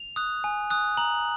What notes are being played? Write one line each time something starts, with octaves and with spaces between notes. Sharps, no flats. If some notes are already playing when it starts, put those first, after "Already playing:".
Already playing: F7
D#6 F#6
G#5
D#6 F#6
A#5 F#7